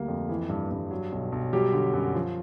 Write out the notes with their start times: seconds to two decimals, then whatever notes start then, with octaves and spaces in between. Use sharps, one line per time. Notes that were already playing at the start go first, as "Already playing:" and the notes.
Already playing: D2 G3 A#3
0.08 F2
0.29 E3
0.49 G2
0.71 G2
0.91 F#3
1.12 B1
1.32 B1
1.53 F#3 G3 G4
1.73 D3
1.94 F#2
2.14 F3